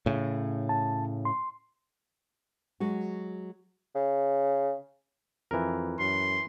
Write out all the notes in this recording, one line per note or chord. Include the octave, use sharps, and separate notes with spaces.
A2 C#3
A5
C6
F#3 G#3 F#4
C#3
F2 E3 A#4
F#2 C6